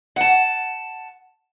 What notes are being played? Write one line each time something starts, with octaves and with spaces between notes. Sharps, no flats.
F#5 A5